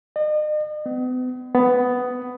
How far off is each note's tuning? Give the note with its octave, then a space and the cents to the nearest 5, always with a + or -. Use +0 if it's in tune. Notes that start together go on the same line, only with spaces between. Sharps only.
D#5 -40
B3 +40
B3 +10